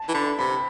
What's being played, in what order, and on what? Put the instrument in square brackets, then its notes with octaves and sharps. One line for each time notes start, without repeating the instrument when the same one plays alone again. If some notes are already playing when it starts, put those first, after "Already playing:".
Already playing: [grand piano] A5
[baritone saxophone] E3
[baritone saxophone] D3 [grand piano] B5
[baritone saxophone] C3 [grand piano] B5